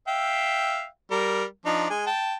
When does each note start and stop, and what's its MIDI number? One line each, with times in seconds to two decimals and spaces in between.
0.08 0.86 76
0.08 0.86 77
0.08 0.86 79
1.11 1.44 55
1.11 1.44 70
1.66 1.89 53
1.66 1.89 62
1.66 1.89 63
1.90 2.06 56
1.90 2.06 80
2.07 2.35 79
2.07 2.35 81